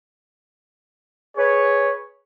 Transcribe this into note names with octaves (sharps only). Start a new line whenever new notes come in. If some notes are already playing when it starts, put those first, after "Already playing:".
G#4 B4 C#5